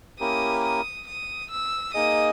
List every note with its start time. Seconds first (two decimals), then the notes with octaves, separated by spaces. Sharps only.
0.20 A#3 C#4 E4 G4 A#4 D#6
0.64 D#6
1.07 D#6
1.51 E6
1.94 A#3 D#4 G#4 D#5 D#6